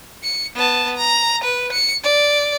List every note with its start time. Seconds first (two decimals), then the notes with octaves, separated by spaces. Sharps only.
0.23 C#7
0.56 B3 A5
0.97 A#5
1.44 B4
1.72 C#7
2.04 D5